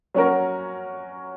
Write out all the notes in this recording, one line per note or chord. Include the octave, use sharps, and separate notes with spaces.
F#3 C#4 F#4 A#4